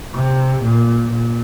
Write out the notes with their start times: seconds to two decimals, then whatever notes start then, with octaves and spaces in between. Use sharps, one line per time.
0.14 C3
0.63 A#2
1.11 A#2